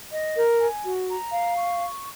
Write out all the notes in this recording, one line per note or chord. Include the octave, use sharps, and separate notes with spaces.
D#5
A#4
G#5
F#4
A#5
F5
C#6